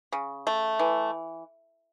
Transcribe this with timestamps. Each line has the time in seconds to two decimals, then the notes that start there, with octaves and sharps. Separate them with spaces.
0.12 C#3
0.47 A3
0.79 E3